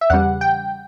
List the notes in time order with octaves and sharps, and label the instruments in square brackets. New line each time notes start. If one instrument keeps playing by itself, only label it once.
[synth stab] E5
E2 C#3 G3 F#5
G5